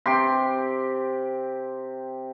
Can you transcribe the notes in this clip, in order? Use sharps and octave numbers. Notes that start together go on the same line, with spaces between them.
C3 G4 C6